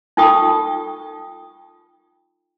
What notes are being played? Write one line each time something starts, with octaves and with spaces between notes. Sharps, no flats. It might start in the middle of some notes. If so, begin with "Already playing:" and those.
D#4 F4 A4 G5 C#6 D#6